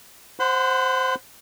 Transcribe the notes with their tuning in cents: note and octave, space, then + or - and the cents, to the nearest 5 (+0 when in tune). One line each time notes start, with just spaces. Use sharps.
C5 +0 F#5 +0 C6 -45